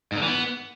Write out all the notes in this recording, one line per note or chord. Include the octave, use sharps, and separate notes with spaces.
G#2
D3
E3
B3